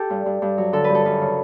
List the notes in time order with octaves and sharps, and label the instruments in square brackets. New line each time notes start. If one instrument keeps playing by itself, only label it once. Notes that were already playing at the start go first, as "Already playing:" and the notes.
Already playing: [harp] G4 A4
G2
G2
G2
F#3
D3 A4
B4
G2
A4
F#2 B4
C#3